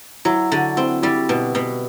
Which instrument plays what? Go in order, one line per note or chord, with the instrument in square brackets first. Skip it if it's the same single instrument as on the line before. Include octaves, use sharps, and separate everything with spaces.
[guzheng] F#3 [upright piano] E4
[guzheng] D3 [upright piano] F#4
[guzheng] C4 [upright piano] E4
[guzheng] G3 [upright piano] E4
[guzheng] B2
B2